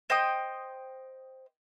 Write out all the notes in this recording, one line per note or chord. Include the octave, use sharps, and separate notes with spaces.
C5 D#5 G5 D#6